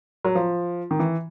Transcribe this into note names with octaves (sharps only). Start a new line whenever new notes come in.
F#3
F3
D#3
E3